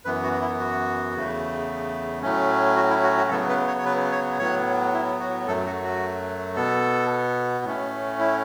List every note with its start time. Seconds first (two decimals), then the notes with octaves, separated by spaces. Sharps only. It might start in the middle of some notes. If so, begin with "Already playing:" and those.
0.05 F#2 E3 B3 B4
0.23 F#4
0.42 E4
0.59 F#4
1.14 E2 C#3 A3
2.22 A2 F#3 A3 C#4
2.76 F#4
2.90 E4
3.03 F#4
3.17 F#4
3.30 C#3 F#3 B3 A4
3.49 B4
3.67 C#5
3.78 C#5
3.85 B4
4.12 C#5
4.39 A2 F#3 B3 C#5
4.93 E4
5.20 F#4
5.48 F#2 F#3 A3 A4
5.66 F#4
5.84 F#4
6.56 B2 B3 A4
7.64 A2 A3 C#4
8.20 E4